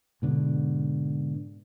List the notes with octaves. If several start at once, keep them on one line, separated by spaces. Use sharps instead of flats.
G#2 B2 D3